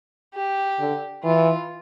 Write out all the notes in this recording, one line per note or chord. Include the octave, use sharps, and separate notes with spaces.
G4
D3
E3 F4